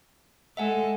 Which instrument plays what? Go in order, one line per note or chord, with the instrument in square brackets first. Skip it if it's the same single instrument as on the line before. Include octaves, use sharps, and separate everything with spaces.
[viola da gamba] G#3 A4 [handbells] E5 F#5 G#5